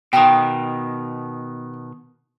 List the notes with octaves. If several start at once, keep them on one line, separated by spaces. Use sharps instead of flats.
B2 D#3 G5 C6 D#6